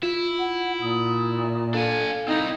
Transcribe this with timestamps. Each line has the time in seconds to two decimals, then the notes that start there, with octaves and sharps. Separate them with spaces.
0.03 E4 F4
0.39 F#5
0.82 A#2 D#6
1.74 D4 A4 F5 G#5
2.28 C4 D#4 E4